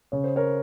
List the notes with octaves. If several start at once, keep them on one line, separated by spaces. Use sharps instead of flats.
C#3 C#5
C5
A#4 C#5